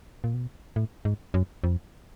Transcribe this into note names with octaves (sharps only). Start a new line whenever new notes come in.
A#2
B2
A2
G#2
F#2
F2